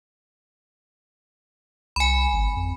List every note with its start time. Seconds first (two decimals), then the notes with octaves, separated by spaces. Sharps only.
1.96 C2 G#5 B5
2.33 G#1
2.56 F2